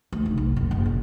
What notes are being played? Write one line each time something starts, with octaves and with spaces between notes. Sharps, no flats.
D2
F1
B1
F#1
F#1
A#2